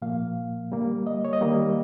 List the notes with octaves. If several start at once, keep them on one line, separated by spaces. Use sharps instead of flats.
A#2 F3 A#3 F5
D3 G3 A#3
D#5
C#5
D#5
D#3 G3 A#3